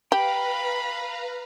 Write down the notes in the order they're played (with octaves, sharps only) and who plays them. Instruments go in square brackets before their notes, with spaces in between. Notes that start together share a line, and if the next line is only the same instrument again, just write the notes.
[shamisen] G4 [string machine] B4 F5 A#5 [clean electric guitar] G5 [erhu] B5